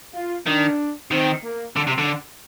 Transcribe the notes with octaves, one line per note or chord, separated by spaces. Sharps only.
F4
D#3 D4
D#3 C4
A#3
D3
C3
D3